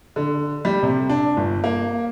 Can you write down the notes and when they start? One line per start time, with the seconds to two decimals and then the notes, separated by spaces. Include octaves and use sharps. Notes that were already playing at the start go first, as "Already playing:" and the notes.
0.16 D3
0.65 G3
0.83 C3
1.09 D4
1.37 G1
1.64 A#3